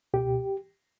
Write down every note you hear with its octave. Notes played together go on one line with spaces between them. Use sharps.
C#2 B2 G4